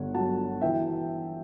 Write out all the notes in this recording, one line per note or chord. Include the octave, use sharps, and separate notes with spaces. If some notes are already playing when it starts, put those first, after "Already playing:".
Already playing: G1 D3 C#5 F#5
F#3 F#5 A5
E3 E5 G5